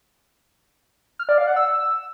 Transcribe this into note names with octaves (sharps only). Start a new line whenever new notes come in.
F6
D5
F5
F#5
E6